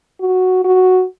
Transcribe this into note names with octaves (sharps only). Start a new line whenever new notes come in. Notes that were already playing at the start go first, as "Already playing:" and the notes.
F#4
F#4